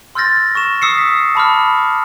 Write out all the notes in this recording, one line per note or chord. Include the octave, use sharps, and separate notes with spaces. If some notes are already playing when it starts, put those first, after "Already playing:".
C6 E6 F6 G6 A6 A#6
C#6 E7
D#6 E6 C7 C#7
B6
A5 B5 D6 F6